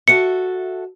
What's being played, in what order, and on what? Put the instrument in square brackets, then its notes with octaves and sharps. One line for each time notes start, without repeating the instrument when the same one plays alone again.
[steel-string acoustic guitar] F#4 A4 E5 [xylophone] C#7